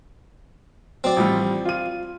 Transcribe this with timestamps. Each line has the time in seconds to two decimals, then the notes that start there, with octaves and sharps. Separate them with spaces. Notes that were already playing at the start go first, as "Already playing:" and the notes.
1.04 F#3 C4 D5
1.16 A1 F3 G3
1.65 F4 D#7